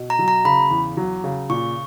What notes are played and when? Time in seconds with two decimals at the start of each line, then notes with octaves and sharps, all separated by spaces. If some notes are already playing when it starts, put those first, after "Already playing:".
Already playing: B2
0.10 A#5
0.19 F#3
0.28 A#5
0.45 C#3 B5
0.71 E2
0.97 F#3
1.24 C#3
1.50 A#2 C#6